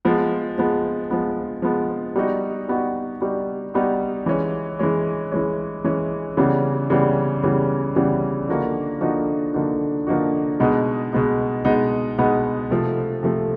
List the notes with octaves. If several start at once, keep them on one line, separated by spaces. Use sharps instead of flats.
F3 G#3 B3
F3 G#3 B3
F3 G#3 B3
F3 G#3 B3
G3 B3 D#4 F#4
G3 B3 D#4 F#4
G3 B3 D#4 F#4
G3 B3 D#4 F#4
E3 G#3 C#4
E3 G#3 C#4
E3 G#3 C#4
E3 G#3 C#4
C#3 E3 G3 B3
C#3 E3 G3 B3
C#3 E3 G3 B3
C#3 E3 G3 B3
D3 F3 A#3 D#4 F#4
D3 F3 A#3 D#4 F#4
D3 F3 A#3 D#4 F#4
D3 F3 A#3 D#4 F#4
B2 G#3 B3 D#4
B2 G#3 B3 D#4
B2 G#3 B3 D#4
B2 G#3 B3 D#4
C3 F3 A3
C3 F3 A3